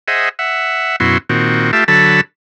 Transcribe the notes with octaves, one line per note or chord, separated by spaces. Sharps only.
G#4 C5 D#5 E5 F#5
E5 F#5
F#2 B2 E4 F#4 C6
A#2 D#3 C4 F#4
A3 F4 G4 E5 A5
D3 F#3 A4 A5 B5